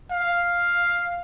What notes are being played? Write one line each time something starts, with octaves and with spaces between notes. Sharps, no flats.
F5